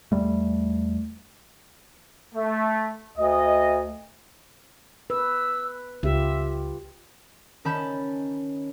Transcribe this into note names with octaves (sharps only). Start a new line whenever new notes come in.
E2 G3 A3
A3
D2 D#5
B4 E6
C#2 F4 G4 E5
D#3 C#4 A5 B5 G6